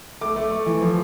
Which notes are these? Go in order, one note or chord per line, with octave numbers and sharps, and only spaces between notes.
A3 D6
A3
A3
E3
F3